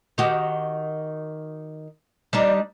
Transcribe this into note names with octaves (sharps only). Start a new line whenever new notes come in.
D#3 F#4 G4
G3 D4 D#4